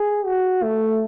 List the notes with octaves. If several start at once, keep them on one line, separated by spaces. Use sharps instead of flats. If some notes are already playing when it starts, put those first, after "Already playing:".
Already playing: G#4
F#4
A3